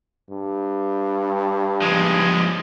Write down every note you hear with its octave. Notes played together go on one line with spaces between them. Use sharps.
G2
F3 G#3